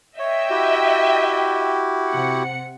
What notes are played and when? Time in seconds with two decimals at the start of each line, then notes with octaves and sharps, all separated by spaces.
0.19 C#5 D#5 E5 G5
0.50 E4 F#4 G4
2.09 C3 F#5 C#7